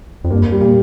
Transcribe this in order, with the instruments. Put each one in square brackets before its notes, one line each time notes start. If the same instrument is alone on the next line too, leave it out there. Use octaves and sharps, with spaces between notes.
[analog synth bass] F2
[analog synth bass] G2 [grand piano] A#3
[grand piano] G3
[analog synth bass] A#2